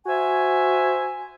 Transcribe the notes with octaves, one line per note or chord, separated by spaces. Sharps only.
F#4 C5 E5 G#5